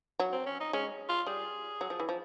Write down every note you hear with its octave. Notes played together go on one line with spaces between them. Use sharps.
F#3
C4
C#4
D#4
G#3 C#4
F4
G3 G#4
F#3
F3
E3
F3